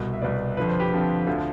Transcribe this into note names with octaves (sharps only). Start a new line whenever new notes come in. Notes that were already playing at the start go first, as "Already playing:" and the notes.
Already playing: C2 B2
E5
C2 B2 B4 D5
F2 D3 F3 B4
C5
G4 B4
F2 D3 F3 C4
D2 D3 F3